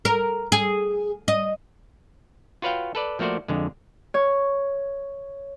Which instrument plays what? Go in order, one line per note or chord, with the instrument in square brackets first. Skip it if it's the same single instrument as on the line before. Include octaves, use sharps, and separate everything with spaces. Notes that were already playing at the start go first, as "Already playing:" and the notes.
[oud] A#4
G#4
D#5
[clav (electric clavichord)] F4 F#4 B4 C#5 F5 G5
A4 B4 D5
F3 A3 A#3 F#4 C5 D5
F2 D3 G#3
[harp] C#5